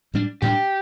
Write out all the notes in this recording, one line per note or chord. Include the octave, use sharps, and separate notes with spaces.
A2 G3 D4
A2 G3 D4 G4